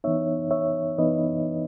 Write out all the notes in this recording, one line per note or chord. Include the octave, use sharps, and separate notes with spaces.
E3 B3 D#4 C#5 E5
C#5 E5
E3 B3 D#4 B4 D#5